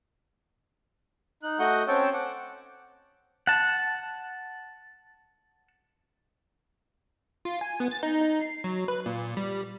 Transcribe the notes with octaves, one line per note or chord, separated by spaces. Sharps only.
D#4 F#6
A3 F#4 D#5 F#5 G6
C4 C#4 C#5 G5 A5 E6
F#5 D6
F#5 A5
F4
G#5
B3
A6
D#4
D#4
C7
F#3
B4
A#2
G3